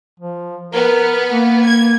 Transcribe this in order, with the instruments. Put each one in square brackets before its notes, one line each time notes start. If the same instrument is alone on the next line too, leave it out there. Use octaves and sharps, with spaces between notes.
[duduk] F3
[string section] B3 [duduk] A#4
[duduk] A#3
[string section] G#6